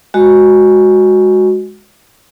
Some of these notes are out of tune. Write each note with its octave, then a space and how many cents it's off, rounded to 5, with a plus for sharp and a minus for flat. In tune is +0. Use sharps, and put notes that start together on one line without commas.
G#3 +0 F#4 +0 D#5 -15